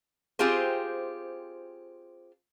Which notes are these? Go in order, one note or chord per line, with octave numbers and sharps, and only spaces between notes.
C4 F4 G4 G#4 C5